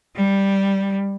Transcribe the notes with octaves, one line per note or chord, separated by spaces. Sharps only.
G3